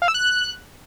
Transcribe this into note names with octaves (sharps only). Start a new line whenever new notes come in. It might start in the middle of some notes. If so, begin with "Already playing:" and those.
F5
E6
F#6